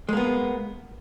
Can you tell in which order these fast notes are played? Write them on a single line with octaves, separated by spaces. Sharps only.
G#3 A#3 B3